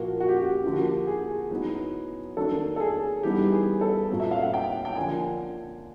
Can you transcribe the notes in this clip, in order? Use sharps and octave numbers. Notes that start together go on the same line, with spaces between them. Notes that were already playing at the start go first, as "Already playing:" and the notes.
Already playing: A#2 F3 A#3 F#4
F#4
G4
F#4
D3 F3 A#3 G4
F#4
G4
G#4
A2 F#3 B3 D#4
D#3 F#3 A#3 D4 A4
A4
G#4
E3 G3 B3 D#4 G4
G#4
A4
A#2 F#3 B3
E5
F5
F#5
G5
G5
D3 F3 A#3 D4 G#5